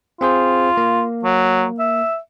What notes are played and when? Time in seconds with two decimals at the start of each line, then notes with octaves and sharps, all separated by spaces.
0.21 C4 F4 G#4 C5
0.77 A#3
1.24 F#3
1.79 E5